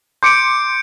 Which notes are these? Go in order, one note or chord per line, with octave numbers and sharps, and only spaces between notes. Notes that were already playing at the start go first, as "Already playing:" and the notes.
C6 D6 G6 C#7 D7